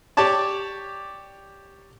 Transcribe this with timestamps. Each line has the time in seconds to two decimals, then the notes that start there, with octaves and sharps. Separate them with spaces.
0.17 G4 C#5 D5 A5 D6